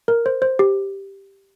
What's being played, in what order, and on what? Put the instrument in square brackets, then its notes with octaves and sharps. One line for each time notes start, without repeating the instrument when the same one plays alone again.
[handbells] A#4
C5
C5
G4